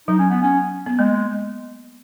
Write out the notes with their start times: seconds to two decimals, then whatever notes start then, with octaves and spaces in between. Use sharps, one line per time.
0.08 F#3 D#4
0.19 C#4
0.30 B3
0.42 C#4
0.86 B3
0.99 G#3 A#3